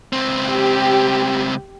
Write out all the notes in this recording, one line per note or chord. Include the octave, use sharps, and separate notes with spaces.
C#2 C4
G4